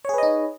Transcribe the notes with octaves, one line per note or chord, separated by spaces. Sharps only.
D#4 G#4 B4 C#5 D#5